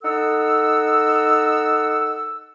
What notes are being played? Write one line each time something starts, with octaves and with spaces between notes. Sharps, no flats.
D#4 A4 F#5 E6